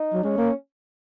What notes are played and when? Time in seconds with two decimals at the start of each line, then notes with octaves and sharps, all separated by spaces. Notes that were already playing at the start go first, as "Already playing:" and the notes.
Already playing: D#4
0.14 F#3
0.24 G#3 C#4
0.38 A#3